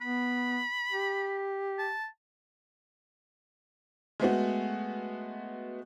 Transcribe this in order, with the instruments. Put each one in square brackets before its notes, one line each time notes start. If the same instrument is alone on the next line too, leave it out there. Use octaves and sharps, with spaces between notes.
[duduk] B3 [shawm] B5
[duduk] G4
[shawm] A5
[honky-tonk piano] G#3 A3 B3 F#4